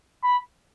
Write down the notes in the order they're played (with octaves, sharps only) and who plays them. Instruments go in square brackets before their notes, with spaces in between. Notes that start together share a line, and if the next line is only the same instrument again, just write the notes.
[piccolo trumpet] B5